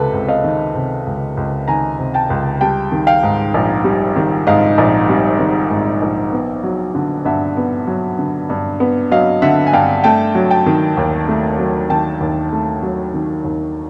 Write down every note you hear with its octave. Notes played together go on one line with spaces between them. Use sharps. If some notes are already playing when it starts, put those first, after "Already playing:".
Already playing: C#2 C3 A4 B4
C#2
D#5 F5
D#3
C3
C#2
C#2
D#3 G#5 A#5
C3
G5 A5
C#2
G3 G5 A5
D#3
F5 G5
G#2
A#1
G3
D#3
G#2 D#5 F5
A#1
G3
D#3
G#2
A#1
B3
F#3
D3
G2 E5 F#5
B3
F#3
D3
G2
B3
F#3 D#5 F5
D3 E5 F#5
G#5
G2 F5 G5
A3 G5 A5
F#3
G5 A5
D#3
D#2
A3
F#3
D#3 G5 A5
D#2
A3
F#3
D#3
D#2